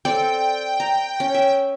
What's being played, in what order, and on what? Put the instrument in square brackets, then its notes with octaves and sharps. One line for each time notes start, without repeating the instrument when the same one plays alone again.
[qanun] C4 A4 D5 [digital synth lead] G5
[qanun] A#5
C#4
E5